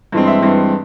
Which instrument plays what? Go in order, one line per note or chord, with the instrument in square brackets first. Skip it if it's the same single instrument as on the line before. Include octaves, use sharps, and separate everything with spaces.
[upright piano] G2 E3 G#3 C4
E5
G2 E3 G#3 C4